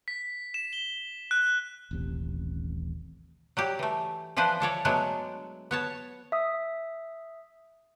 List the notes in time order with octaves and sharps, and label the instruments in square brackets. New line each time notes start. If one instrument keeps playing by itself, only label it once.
[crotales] B6
E7
G7
F#6
[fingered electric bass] D#1 A1 C3
[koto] F#3 G3 G4
E3 A3
E3 F3 D4 B4 C5
D4 A4 C#5 D5
F#3 G#3 A3 B3 D4
B3 C#5 A5
[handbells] E5 D#6